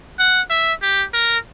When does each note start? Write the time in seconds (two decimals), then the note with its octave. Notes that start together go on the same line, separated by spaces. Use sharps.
0.19 F#5
0.50 E5
0.82 G4
1.14 A#4